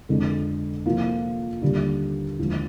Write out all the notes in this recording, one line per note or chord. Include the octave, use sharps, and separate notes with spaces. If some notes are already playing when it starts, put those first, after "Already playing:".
F2 D3 G#3 D4
C3 F3 A#3 F4
D#2 D3 G3 D4
D#2 D3 F3 G#3